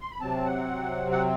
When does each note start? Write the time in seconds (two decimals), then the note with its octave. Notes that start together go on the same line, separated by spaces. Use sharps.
0.01 C6
0.11 B5
0.20 C3 F#3 C4 A5
0.46 F#5
1.11 F#5